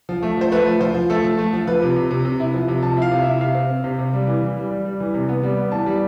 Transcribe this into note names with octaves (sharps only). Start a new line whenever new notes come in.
F3
A3
F3 C5
A3 B4
F3
F3 C5
F3
A3 A4
F3
A3
F3
F3 B4
C3
C3
C3
C3
E4
F3
C3
F3 A5
E4 F5
C3
E5
E4
C3 F5
C4
C4
C3
C3
G3
E3
E3
G3
G3
G3
E3
C3
B3
G3
B3
E3 A5
G3